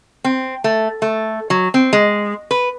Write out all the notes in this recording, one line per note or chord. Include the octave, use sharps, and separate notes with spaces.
C4
A3
A3
F#3
C4
G#3
B4